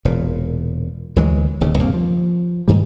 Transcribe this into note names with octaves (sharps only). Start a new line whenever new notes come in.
E1 A#2
D2 E3 F#3 G#3
D1 D#2 C#3
C2 G2 A#3 C4
F3
G2 D#3 G3